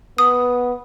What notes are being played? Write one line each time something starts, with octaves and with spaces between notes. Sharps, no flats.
B3 D#6